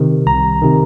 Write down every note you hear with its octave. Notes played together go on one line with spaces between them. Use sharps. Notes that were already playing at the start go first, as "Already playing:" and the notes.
Already playing: C3 D#3
C2 A#5
C3 D#3